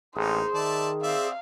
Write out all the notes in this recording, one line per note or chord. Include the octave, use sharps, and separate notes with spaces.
A1 A#3 D#4 G#4 C5
D#3 D5 E5 A5
C4 D5 E5 F5